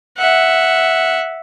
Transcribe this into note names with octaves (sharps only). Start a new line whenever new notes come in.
E5 F#5